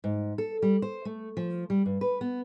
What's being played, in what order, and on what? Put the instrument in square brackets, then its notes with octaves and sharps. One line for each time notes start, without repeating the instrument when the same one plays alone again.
[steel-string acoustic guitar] G#2
A4
G3
C5
A3
F3
G3
G2
B4
B3